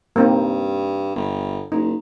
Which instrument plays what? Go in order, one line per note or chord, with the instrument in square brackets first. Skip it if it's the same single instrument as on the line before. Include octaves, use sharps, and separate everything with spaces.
[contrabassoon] G2 [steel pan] A#3 C4 D#4
[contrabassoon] G1
[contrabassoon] F#1 [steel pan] D#4